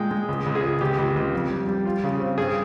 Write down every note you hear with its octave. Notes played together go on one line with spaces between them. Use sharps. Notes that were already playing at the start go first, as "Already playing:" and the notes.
Already playing: A#2 G#3 G5
G#3
C#2
C#2
G#4
C#2
C#2 G4
C#2
C#2
F2
G3
G3
F4
C#3
C4
G2 G#4